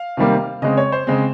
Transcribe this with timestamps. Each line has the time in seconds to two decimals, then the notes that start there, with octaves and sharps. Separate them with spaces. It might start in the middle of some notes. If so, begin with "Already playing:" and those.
Already playing: F5
0.17 C3 D#3 G3 A#3
0.62 C#3 G#3 C4 D#5
0.77 C#5
0.92 C5
1.07 C#3 G#3 C4